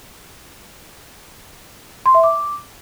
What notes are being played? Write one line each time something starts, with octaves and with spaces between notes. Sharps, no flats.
C6
E5
D6